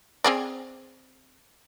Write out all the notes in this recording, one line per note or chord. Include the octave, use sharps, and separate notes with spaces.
C4 G#4 D5